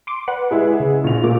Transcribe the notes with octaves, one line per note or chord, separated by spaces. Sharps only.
C6 D6
B4 D5 F#5
G#3 E4 G#4
C#3
A#1 F7
A#2 D6